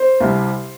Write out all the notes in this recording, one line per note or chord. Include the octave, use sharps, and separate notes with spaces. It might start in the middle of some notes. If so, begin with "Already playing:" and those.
Already playing: C5
C2 C3 G3